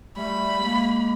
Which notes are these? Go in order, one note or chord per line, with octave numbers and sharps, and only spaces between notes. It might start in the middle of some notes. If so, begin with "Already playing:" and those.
G3 A3 B5
G#3 A#3